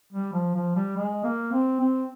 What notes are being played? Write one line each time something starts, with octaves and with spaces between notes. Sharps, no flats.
G3
F3
F3
G3
G#3
A#3
C4
C4